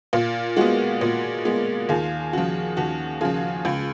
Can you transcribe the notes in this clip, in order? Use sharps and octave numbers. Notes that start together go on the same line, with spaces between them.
A#2 F4
G#3 B3 F#4
A#2
G#3 B3
D#2 F4 G#4
C#3 F3 F#4
D#2 F#4
C#3 F3 F4 G#4
C#2